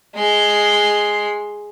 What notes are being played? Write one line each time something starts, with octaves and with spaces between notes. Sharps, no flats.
G#3 C6